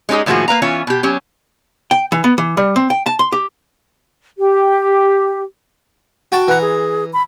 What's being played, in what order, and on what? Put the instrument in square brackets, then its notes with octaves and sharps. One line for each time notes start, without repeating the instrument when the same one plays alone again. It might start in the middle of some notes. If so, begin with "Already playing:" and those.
[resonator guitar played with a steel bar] G#3 C#4 D#4 G4 G#4
A2 D#3 F3 A#3 F#4 G#4
A#3 B4 F5 A#5
E3 B3 C#4 F4 C#5
B2 G4
F#3 C#4 G4
[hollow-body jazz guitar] G5
E3
B3
E3
G3
C4
G5
A5
C6
G4
[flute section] G4
[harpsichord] F#4 G5 A5
[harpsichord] E3 A#5 [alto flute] F#5
[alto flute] G#4
B5